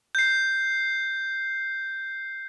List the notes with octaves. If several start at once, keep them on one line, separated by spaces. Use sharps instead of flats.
G6 C7